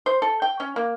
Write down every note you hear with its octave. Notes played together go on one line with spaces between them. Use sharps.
C5
A4
G5
C#4
A#3